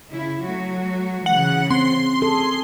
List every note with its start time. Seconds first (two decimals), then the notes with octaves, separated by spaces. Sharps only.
0.12 C#3 E4
0.42 F#3 A3 F#4
1.26 C#3 E3 F#5
1.70 C4 C6
2.22 G#4 A4